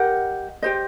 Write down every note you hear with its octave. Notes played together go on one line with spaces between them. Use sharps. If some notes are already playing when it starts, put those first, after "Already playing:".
Already playing: G4 A#4 D#5 F#5
G4 C5 D#5